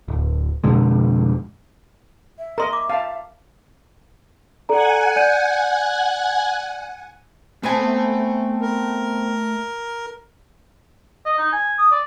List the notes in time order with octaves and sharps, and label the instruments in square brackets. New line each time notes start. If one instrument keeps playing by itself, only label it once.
[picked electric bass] D1
F2 B2 D3 G#3
[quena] E5
[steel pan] A#4 D#5 [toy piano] A#5 C6
[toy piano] D6
[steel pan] F5 A5
[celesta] A4 D5 A#5 [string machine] F#5 G#5
[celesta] D5 G6 D#7
[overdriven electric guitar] A3 A5 [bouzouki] B3 C4 G#5
[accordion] A#4
[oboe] D#5
D#4
G#5
D#6
D5